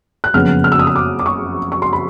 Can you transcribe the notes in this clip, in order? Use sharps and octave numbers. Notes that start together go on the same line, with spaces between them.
F#6
F#1 F2 C#3 F#3 B3 F6
F6
E6
D#6
E6
D6
D6
C#6
C#6
C6
B5